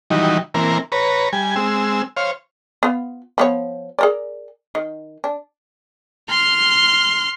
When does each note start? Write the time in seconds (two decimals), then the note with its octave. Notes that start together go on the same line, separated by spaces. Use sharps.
0.10 D#3 E3 F#3 G3 D#4
0.54 E3 A#3 C4 A#4
0.92 B4 C#5 A#5
1.33 G3 G#5
1.56 G#3 C4 E6
2.17 C5 C#5 F5
2.83 B3 F4
3.38 F3 B3 C#5
3.99 G#4 A#4 D5
4.75 D#3
5.24 D4
6.30 C6 F6